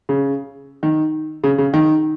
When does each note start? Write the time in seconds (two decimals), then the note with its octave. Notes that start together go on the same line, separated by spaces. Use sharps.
0.09 C#3
0.83 D#3
1.44 C#3
1.58 C#3
1.74 D#3